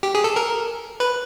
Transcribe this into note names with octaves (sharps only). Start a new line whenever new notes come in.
G4
G#4
A4
A#4
B4